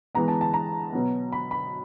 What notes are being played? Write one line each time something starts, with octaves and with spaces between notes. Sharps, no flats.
E3 G#3 B3 A#5
A5
A5
A#5
B2 F#3 B3
B5
B5